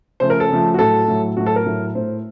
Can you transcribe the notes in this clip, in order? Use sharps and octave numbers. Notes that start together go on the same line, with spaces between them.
C#3 F3 A3 C5
A#4
A4
C#3 F3 A3
F#4
A2 F#3 A3 A4
A2 F#3 A3
A2 F#3 A3 F#4
A4
A#4
A2 F#3 A3
A2 A3 C5